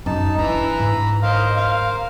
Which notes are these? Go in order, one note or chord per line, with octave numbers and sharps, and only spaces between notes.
F#2 D#4 A5
E3 D4 A#5 B5
G#2
A#4 C5 D#5 F5
F5